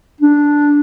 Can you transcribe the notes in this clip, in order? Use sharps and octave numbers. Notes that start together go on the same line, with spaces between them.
D4